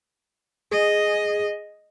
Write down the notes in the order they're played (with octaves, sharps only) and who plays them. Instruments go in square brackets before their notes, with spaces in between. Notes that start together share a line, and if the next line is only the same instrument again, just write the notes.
[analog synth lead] G#4 [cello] D#5